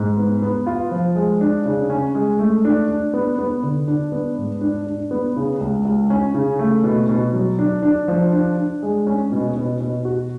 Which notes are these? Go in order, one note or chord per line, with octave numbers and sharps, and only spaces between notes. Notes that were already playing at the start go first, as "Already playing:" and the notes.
Already playing: G#2
B3
B3
F4
F3
G#3
D4
C#3
C#4
G#3
A3
D4
D4
B3
B3
D3
D4
B3
G#2
D4
D4
B3
C#3
C#2
C#2
C#4
C#3
A3
B2
B2
F#3
D4
D4
F3
D4
D4
G#3
C#4
B2
B2
B2
F#4